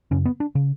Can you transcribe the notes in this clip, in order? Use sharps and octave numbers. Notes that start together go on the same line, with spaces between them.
F#2 C#3 C#4
B3
D4
C#3